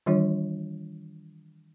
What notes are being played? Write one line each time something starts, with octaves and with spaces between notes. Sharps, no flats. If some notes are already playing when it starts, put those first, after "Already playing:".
D#3 E3 G3 D4 F4 C#5